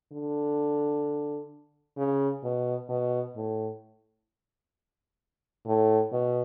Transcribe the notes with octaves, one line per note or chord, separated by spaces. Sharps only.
D3
C#3
B2
B2
A2
A2
B2